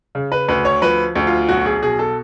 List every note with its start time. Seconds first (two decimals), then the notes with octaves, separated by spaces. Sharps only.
0.15 C#3
0.32 B4
0.48 D2 B4
0.65 C#5
0.82 F3 B4
1.15 D2
1.27 F4
1.49 B1 F#4
1.66 G#4
1.82 B2 G#4
1.99 A4